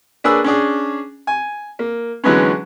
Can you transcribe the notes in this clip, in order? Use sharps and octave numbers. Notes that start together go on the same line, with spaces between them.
A#3 D4 G#4 B4 C#5 E6
C#4 D4 G#4
G#5
A#3
D3 E3 F#3 G#3 B3 C#4